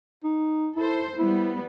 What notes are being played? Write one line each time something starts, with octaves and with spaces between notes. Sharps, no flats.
D#4
E4 A4 C5
G3 B3 E4